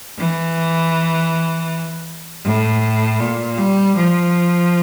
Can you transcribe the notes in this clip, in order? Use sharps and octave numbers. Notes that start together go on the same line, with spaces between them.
E3
A2
A#2
G3
F3